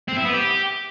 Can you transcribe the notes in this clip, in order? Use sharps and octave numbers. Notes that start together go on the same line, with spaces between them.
C4
E4
B3
G4